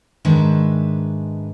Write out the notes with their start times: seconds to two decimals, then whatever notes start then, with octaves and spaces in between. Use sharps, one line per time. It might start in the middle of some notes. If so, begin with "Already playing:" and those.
0.25 G#2 D#3 G#3 D4 B4 E5